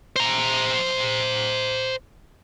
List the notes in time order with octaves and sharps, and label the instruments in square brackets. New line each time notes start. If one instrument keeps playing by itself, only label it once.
[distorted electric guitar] C5 A#5